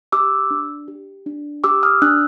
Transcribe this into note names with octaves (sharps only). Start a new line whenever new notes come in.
G4 D6 E6
D4
G4
D4
G4 D6 E6
D#6 F6
D4 E6 F#6